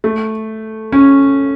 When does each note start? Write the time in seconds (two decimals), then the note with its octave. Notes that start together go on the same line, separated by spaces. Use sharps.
0.04 A3
0.92 C#4